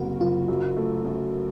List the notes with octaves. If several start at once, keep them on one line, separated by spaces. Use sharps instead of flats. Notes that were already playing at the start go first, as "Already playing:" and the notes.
Already playing: F#1 C3 A#3 F#4 A#4
F#1 F4
F#2
A3
F#2